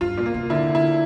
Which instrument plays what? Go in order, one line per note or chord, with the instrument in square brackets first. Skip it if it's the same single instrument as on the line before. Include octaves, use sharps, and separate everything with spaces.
[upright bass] G2 [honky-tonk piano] F4
[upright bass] A#2
[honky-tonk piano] A#3
[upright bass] C3
[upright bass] D3 [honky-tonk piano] E4
[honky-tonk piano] E4